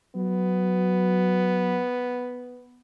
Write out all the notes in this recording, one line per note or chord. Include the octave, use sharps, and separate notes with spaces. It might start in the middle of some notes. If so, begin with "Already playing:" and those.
F#3 B3